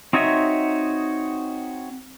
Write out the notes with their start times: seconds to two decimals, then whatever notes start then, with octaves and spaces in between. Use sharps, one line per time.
0.13 C4 D#4 F#4 C#5 D#5 E5